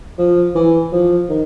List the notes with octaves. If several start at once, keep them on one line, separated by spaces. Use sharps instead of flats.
F3
E3
F3
D#3